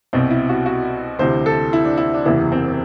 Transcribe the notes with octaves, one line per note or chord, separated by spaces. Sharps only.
C2 B2 C4
E4
F#4
F#4
D2 C3 E3 C5
A4
E4
D4
E4
D4
F#1 E2 C3 E3 E4
C4